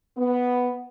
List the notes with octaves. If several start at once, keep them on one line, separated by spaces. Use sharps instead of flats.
B3